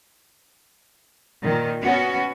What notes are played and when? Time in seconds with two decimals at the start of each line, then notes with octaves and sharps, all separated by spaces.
1.44 A#2 D#3
1.84 B3 C#4 F#4